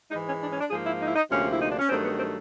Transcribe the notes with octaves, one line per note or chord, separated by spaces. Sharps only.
G#2 E3 G#3 D#4
C#4
D4
C#4
D4
G#2 F3 A#3 G#4
E4
D#4
E4
D#4
D2 C3 F3 A#3 C#4
E4
D#4
D4
C#4
G2 D#3 F#3 A3 C4
B3
C4